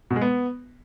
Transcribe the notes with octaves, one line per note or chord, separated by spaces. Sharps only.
B2
G#3
B3